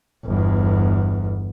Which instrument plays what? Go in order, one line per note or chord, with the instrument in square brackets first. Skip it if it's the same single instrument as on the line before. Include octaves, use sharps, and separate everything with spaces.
[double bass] G1 E2